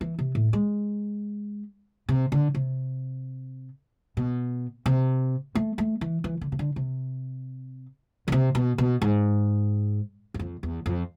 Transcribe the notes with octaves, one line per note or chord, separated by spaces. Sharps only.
E3
C3
A2
G#3
C3
D3
C3
B2
C3
A3
A3
E3
E3
D3
C3
D3
C3
D3
C3
B2
B2
G#2
E2
F2
E2
F2